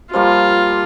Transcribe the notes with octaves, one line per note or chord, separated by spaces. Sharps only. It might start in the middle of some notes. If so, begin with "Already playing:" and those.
F3 G3 A#3 F4